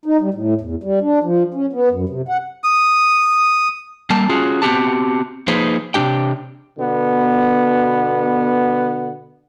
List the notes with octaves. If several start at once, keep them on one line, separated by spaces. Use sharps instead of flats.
D#4
G3
A2
E2
G3
D4
F3
C#4
B3
F#2
C3
F#5
D#6
G3 A#3 A5
C#4 F4 F#4 G#4
B3 C4 F#4 G4 A5
F3 A#3 D#4 G#4 B4 C5
C3 G3 D4 G4 G5
B2 D3 B3